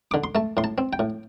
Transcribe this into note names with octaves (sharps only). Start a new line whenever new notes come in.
D3 D6
C6
A3 A5
A2 C6
A5
C4
G5
A2